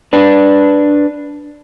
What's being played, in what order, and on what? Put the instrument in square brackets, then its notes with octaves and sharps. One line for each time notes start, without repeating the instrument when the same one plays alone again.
[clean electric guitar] D4 B4